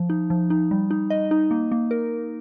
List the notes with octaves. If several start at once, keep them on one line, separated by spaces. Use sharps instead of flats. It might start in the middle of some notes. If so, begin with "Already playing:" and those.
Already playing: F3
D#4
F3
D#4
G3
D#4
D#5
D#4
A#3
A#3
A#4